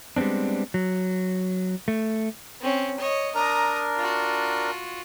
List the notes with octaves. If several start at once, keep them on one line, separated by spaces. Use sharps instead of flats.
G3 G#3 B3 C4 D4
F#3
A3
C4 C#4
C#5 D#5
D4 A#4 A#5 D#6
F4 F#4